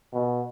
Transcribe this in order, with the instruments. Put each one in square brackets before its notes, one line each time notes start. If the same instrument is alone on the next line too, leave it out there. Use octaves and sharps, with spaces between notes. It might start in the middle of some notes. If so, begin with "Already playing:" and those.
[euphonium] B2